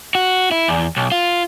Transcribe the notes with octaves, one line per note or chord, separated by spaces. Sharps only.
F#4
E4
E2
B1
F4